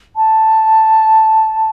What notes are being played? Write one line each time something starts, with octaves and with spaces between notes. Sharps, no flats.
A5